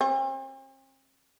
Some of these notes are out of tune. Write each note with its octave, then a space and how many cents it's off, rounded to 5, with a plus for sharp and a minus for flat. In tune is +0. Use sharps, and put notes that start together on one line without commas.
C4 +45